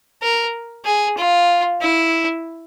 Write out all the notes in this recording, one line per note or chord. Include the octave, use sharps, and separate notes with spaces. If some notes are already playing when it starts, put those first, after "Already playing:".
A#4
G#4
F4
E4